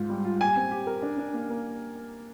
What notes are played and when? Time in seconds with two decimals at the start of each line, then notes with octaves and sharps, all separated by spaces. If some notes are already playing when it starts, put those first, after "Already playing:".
Already playing: G#2 F4
0.09 G3
0.25 F4
0.40 G4 G#5
0.56 C4
0.71 G4
0.87 A#4
1.02 D4
1.18 D4
1.34 A#3
1.49 A#3